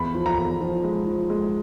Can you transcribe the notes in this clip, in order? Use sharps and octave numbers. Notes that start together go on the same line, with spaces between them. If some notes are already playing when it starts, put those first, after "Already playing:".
Already playing: E2 B5
F3
A#5
E2
F3
G#3
F3
G#3